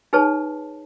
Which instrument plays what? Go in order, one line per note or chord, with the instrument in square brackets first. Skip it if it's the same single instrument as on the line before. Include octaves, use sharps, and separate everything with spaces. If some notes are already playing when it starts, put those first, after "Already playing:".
[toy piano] D#4 G#4 B4 C#5 A5